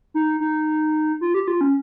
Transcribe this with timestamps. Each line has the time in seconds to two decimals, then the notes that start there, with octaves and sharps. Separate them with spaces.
0.14 D#4
0.40 D#4
1.21 F4
1.34 G4
1.48 F4
1.61 C#4